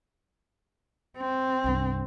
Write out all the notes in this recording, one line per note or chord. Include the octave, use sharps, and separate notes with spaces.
C4
C2 G2